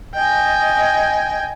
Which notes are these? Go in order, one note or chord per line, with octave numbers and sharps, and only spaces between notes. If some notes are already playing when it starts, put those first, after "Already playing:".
D#5 G5 G#5